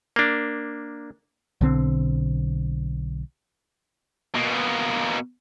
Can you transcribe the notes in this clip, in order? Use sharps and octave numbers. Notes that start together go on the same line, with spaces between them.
A#3 D4
B1 D3 C4
B2 A#3